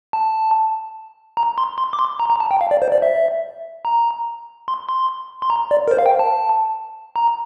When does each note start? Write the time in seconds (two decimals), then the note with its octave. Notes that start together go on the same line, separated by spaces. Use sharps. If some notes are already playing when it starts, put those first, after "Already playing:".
0.13 A5
1.37 A#5
1.58 C6
1.78 C6
1.93 D6
1.99 C6
2.20 A#5
2.30 A#5
2.40 A5
2.51 G5
2.61 F5
2.71 D5
2.82 C5
2.92 D5
3.02 E5
3.85 A#5
4.68 C6
4.89 C6
5.42 C6
5.50 A#5
5.71 D5
5.88 A#4
5.91 C5
5.98 F5
6.06 G5
6.19 A5
7.16 A#5